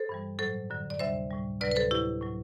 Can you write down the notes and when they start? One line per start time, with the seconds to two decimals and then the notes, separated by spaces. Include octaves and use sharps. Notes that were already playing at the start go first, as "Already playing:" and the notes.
Already playing: A4 C5
0.09 G2 E3 G3
0.39 A2 F#3 A4 C5
0.70 F#2 D3 F#3
0.90 D5
0.99 D2 C3 G3 C5 E5
1.31 A2 G3
1.60 D2 C3 F#3 B4 D5
1.72 B4
1.76 A4 C5
1.91 A2 F#3 E4 G4
2.21 A2 F#3